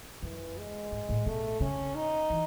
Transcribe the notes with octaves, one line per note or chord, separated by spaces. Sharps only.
F#2 E3
G#3
G#2
A2
B2 A3
C#3 C#4
D#4
E3